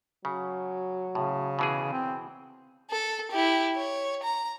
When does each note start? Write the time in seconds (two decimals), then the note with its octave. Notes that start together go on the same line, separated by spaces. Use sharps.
0.25 C#3 F#3
1.15 A2 C#3
1.59 B2 E3 G#4
1.92 C4
2.90 A4
3.31 E4 G4
3.76 C#5
4.23 A#5